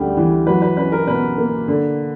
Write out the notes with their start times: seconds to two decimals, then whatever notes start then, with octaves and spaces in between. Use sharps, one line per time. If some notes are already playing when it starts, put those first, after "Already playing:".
Already playing: D2 C#3 G3
0.17 E3
0.47 F#3 B4
0.62 B4
0.77 C#4 B4
0.92 A#4
1.07 B2 B4
1.37 A#3
1.68 D3